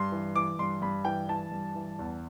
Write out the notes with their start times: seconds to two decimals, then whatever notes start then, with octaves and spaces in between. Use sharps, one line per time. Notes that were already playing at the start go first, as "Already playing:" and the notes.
Already playing: G2 C6
0.12 E3
0.35 E3 D6
0.59 G2 C6
0.82 G2 B5
1.05 E3 G5
1.29 E3 A5
1.51 G2
1.75 E3
1.99 E2